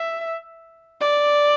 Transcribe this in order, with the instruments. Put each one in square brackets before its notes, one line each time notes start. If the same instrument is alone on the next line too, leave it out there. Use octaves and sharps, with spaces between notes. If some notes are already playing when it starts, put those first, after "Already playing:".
Already playing: [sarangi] E5
D5